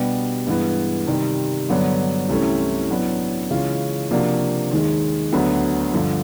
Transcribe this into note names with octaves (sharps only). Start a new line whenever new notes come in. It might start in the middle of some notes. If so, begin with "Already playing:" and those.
Already playing: B2 G3 B3 D4 G4
G2 E3 G#3 B3
C3 D#3 G3
G2 D3 F#3 B3 D4
C2 C3 E3 A3 C#4
A2 F#3 B3 D4
C#3 E3 G#3 C#4 F4
C3 F3 A#3 D4 F#4
D#2 D#3 G#3
D2 D3 F#3 B3
G2 D3 F3